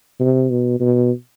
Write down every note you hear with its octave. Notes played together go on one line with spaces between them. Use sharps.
C3
B2
B2